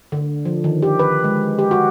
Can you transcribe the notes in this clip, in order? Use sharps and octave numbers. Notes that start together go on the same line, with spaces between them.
D3
F3
D#3
G4
B4
G#3
G4
F#4